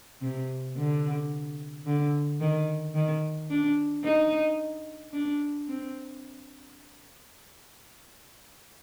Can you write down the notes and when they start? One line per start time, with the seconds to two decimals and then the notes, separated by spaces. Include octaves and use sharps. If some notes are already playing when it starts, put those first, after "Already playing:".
0.21 C3
0.77 D3
1.86 D3
2.41 D#3
2.95 D#3
3.50 D4
4.04 D#4
5.13 D4
5.68 C4